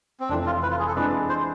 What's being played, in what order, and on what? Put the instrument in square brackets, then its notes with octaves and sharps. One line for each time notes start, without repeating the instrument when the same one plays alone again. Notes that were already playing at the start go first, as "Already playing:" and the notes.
[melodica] C4
[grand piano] F1 F2 E3 A3 [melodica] D4
[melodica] F4
B4
F4
G#4
A4
[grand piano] F2 E3 G#3 D4 [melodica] B4
[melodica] C5